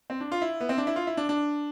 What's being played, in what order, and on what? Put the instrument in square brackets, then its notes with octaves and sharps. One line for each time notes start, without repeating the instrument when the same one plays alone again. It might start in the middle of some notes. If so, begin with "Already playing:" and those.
[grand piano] C4
D4
F4
E4
B3
C4
D4
E4
F4
E4
D4
D4